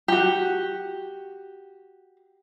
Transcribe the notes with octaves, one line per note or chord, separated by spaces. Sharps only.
F#4 G4